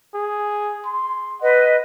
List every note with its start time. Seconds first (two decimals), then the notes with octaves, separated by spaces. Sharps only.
0.14 G#4
0.85 C6
1.42 B4 D#5 F#5